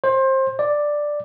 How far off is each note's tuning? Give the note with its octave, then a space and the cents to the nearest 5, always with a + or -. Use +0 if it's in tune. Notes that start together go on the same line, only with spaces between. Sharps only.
C5 +25
D5 +5